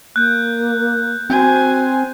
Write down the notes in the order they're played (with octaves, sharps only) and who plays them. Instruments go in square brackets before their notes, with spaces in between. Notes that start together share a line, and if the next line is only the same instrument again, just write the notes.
[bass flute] A#3 [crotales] F#6 G6
[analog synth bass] C4 [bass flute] F#4 [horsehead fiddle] C5 G#5